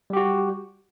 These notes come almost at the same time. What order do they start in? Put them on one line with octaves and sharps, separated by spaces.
G3 G4 F#4